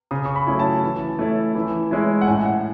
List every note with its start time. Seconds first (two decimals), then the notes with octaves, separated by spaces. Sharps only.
0.11 C#3 D#6
0.25 C#6
0.36 B5
0.47 F#3 A3 C#4 E4
0.59 A5
0.83 E3
1.19 A3 C#4 E4
1.55 E3
1.91 G#3 C#4 E4
2.21 F#5
2.27 A2 G#5
2.45 F#5